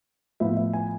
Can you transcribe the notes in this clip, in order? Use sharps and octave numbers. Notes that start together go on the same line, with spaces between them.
A2 F3 B3 E4 E5
E5
G#5